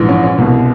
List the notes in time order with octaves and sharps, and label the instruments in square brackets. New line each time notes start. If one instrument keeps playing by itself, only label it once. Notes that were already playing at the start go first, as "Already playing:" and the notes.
Already playing: [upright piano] A#1 G#2 E3
C#4
C#4
C2 B2